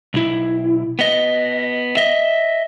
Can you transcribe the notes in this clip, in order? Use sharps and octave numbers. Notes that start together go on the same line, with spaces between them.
B1 E4
B3 D#5
D#5 E5